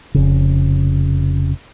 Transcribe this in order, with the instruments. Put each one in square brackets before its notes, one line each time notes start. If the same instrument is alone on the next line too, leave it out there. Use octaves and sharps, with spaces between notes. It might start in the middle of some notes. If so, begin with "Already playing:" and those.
[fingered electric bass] F1 C#3